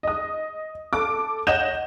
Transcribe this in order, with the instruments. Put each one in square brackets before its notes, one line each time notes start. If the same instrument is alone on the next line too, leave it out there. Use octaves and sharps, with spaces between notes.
[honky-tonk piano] D#5 D#6
A4 D6
C#5 D#5 F#5 G6 E7